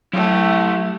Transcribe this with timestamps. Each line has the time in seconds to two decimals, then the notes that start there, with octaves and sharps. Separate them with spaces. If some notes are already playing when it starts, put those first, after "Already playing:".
0.13 F#3 A3 E4 G4